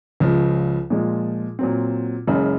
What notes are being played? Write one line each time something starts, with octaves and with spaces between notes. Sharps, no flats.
C#2 C#3 F3
A#2 F3 G#3
A#2 F#3 C4
F#1 F#2 C#3 G#3